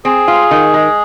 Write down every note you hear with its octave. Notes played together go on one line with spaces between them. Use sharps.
C4 G#4
F4
D#3
G#3